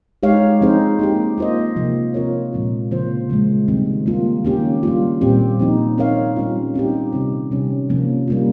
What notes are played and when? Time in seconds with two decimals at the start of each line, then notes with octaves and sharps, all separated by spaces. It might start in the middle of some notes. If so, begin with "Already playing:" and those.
0.23 G#3 D#4 G4 C#5 F5
0.61 F3 C4 D#4 G#4 C5
0.99 A#3 D#4 G4
1.38 A#3 F4 C5 D#5
1.76 C3 F3 A#3 F4
2.14 C4 F4 A#4 C#5
2.53 A#2 F3 G#3 C4
2.91 C#3 F3 A#3 F4 C5
3.30 C#3 F3 G#3
3.68 D#3 G3 C4
4.06 G3 A#3 F4
4.45 D#3 A#3 C#4 G4
4.83 G3 A#3 F4
5.21 A#2 G3 C4 G4
5.59 F3 C4 D#4
5.98 C4 D#4 A#4 C#5 F5
6.36 G3 C#4 F4
6.74 G3 C4 D#4 G4
7.13 C3 D#3 G3 C4
7.51 C3 G3 C#4
7.89 C3 F3 A#3 C#4
8.28 G3 A#3 F4